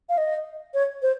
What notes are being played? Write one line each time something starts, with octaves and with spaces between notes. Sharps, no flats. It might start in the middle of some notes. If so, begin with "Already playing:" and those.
F5
D#5
C#5
C5